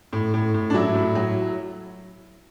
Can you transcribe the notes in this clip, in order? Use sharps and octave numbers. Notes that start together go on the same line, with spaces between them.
A2
A2
A2
D4
F#3 E4
A2
F#3